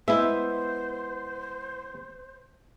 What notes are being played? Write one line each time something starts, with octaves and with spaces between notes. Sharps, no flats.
G#3 B3 E4 C5 E5